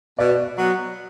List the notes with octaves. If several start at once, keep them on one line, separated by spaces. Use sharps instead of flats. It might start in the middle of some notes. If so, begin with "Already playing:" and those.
B2 D5
F#3 B3